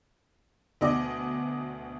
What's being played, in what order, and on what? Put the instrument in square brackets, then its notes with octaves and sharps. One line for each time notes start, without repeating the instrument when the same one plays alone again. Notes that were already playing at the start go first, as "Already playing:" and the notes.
[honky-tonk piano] D2 B2 D#5 D6